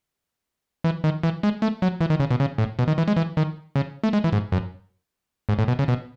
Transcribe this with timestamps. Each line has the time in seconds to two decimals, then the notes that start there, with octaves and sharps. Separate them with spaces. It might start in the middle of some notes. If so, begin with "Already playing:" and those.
0.84 E3
1.04 D#3
1.23 E3
1.43 G#3
1.62 A3
1.82 F#3
2.01 E3
2.10 D#3
2.20 C#3
2.31 B2
2.40 C#3
2.58 A2
2.79 B2
2.88 D#3
2.98 E3
3.08 G#3
3.16 E3
3.37 D#3
3.76 C#3
4.04 A3
4.13 G#3
4.24 E3
4.33 G#2
4.52 F#2
5.49 G#2
5.59 A2
5.68 B2
5.79 C#3
5.88 B2